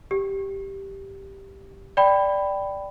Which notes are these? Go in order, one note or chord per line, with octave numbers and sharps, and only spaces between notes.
G4
D5 G5 B5